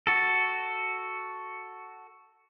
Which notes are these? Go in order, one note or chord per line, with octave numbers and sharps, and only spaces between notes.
F#4 A4